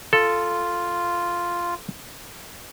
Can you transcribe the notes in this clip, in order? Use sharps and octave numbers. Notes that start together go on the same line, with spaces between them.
F4 A4